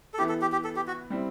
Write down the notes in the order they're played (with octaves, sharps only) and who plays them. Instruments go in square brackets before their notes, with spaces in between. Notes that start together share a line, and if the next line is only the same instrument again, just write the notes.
[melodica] A4
[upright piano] E3 B3 E4 [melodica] G4
[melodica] A4
G4
G4
A4
G4
F#4
[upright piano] G3 C4 E4